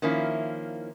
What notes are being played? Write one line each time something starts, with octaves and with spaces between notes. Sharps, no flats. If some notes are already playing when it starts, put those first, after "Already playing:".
D#3 F3 A#3 C#4 E4